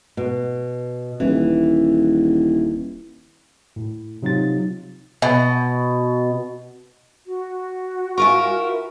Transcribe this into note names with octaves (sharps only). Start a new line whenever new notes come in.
B2
D#1 E3
A2
C3 F#3 D#4 F4 A6
B2
F#4
E4 F4 A#4 G#5 C#6